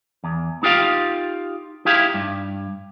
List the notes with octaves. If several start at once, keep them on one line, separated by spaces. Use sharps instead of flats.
E2
D#4 F4 G4 F5
D#4 E4 G4 F5
G2